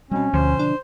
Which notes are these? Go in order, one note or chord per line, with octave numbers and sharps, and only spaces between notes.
B2 G3 C4 C#4
D2 B2 D3 F3 C5
D4